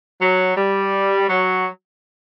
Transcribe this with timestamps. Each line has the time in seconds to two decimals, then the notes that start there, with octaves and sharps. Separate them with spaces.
0.21 F#3
0.57 G3
1.28 F#3